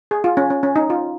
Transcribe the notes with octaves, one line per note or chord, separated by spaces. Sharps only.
G#4
F4
C#4
C#4
C#4
D#4
F4